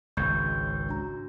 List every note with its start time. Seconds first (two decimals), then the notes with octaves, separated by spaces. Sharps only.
0.17 G#1 C#2 C#6 G6 G#6
0.89 D4 F#4 A#5